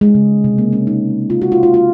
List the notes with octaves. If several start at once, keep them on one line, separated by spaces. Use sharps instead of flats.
G#3
C#3
C3
A#3
C#4
D#4
F4
F#4
F4
F4
F4